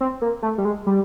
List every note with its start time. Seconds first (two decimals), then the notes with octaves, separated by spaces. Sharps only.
0.01 C4
0.22 A#3
0.42 A3
0.58 G3
0.65 G#3
0.86 G3